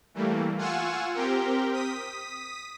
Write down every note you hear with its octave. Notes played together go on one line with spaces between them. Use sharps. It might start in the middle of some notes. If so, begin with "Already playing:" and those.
E3 G3 A3 A#3
F4 F#5 G#5 C#6 E6
C4 G4 A#4 G5
D#6 B6